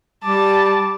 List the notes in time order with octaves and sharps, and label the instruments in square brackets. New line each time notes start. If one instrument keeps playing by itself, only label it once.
[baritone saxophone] G3 [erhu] A5 [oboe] D6